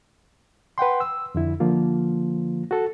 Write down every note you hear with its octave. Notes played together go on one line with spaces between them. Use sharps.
B4 F#5 G5 C6
E6
F2 D3 E4
D3 F3 A#3 F4
F#4 A4